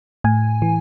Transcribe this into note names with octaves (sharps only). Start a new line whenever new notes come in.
A2 G#5
E3